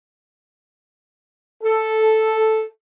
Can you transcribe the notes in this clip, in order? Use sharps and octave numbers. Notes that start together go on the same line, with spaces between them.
A4